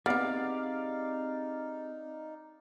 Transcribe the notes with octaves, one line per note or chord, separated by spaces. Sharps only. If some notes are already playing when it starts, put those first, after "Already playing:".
B3 C4 D#4 E4 G4 G#4 D5 F5